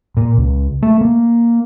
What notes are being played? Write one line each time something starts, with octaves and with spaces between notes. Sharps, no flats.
A#2
C#2
A3
A#3